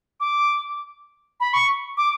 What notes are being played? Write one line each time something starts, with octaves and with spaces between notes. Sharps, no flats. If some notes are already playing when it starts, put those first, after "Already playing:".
D6
B5
C#6
D6